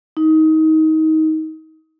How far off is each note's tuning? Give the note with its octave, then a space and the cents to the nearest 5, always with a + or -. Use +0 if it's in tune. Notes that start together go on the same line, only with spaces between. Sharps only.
D#4 +20